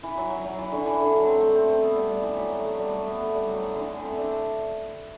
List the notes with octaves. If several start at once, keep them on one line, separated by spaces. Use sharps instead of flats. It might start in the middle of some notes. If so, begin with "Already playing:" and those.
E3
F#3
F#3
F#3
E3
D3
E3
D3
F#3
C4
A3
C4
C4
B3
G3
G3
E3
F#3
A3
A3
G3
A3
B3
A3
G3
F#3
E3
D3
E3
C4
D4